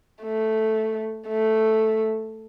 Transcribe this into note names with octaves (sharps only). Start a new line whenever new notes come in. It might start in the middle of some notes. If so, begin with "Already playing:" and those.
A3
A3